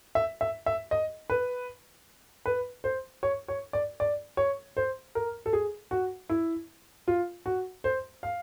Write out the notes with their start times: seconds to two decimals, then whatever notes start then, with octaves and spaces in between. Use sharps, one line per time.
0.15 E5
0.41 E5
0.66 E5
0.91 D#5
1.30 B4
2.46 B4
2.84 C5
3.23 C#5
3.48 C#5
3.73 D5
4.00 D5
4.37 C#5
4.77 C5
5.15 A#4
5.46 A4
5.53 G#4
5.91 F#4
6.30 E4
7.08 F4
7.46 F#4
7.84 C5
8.23 F5